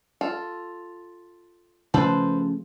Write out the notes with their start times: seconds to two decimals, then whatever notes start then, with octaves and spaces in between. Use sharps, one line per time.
0.21 F4 A4
1.94 C#3 F3 A3 A4 B4 C5